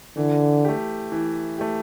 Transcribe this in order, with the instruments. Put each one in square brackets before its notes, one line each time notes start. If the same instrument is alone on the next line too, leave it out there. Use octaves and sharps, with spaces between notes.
[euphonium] D3 [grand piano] E3
[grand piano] A3 G4
E3
A3 G4